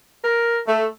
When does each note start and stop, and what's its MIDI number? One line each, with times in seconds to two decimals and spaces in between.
0.24 0.57 70
0.67 0.85 57